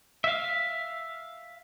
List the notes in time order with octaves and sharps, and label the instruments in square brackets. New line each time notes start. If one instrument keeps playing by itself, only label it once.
[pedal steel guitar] E5 F5